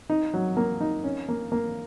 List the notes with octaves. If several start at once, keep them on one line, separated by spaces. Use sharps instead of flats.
D#4
F#3
A#3
D#4
C#4
A#3
A#3